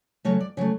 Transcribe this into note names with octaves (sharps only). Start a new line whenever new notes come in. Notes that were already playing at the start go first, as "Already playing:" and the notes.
C#3 F#3 A3 C#5
D5
C#3 F#3 A3 C#5